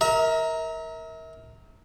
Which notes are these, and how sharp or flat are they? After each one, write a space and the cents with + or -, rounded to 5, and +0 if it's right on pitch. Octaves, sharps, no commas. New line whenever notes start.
A#4 +0 E5 -40